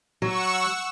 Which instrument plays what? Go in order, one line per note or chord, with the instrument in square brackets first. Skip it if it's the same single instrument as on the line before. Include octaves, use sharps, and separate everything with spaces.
[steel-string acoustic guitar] F#3 [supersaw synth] F#5 C#6 E6